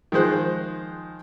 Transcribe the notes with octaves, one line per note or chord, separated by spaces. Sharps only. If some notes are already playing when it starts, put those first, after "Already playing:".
D#3 F3 G#3 C5 F#6